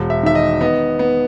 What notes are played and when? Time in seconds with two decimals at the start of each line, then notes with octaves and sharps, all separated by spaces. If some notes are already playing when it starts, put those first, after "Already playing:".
Already playing: E1
0.10 E5
0.23 D#3 E5
0.35 D#5
0.61 B3 D#5
0.99 B3